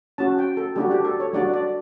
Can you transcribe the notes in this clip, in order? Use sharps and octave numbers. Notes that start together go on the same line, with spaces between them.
C#4 F#4 A5
G5
A4
G3 D4 F#4 G4
G4
A4
C#5
G3 D4 F#4 D5
D5